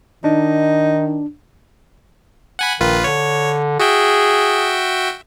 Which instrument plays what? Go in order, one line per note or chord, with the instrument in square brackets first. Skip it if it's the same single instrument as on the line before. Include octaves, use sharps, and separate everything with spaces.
[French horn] D#3 [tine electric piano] D4 [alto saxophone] D#4
[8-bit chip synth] F#5 G#5 B5
[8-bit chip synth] A#1 F4 B4 [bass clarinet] D#3
[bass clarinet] D3 [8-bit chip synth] C#5
[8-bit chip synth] F#4 E5 G5 [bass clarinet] G#4